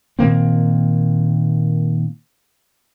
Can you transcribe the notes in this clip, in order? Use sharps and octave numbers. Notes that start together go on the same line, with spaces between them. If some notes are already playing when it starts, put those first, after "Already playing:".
A#2 D#3 A#3 C4